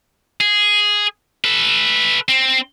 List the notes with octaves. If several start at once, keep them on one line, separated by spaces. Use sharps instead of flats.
G#4
A4 B4
C4